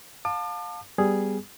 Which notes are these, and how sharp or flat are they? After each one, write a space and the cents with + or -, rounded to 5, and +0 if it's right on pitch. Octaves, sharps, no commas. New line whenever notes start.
F5 +25 A5 +15 D6 +40
G3 +0 B3 +0 G#4 +0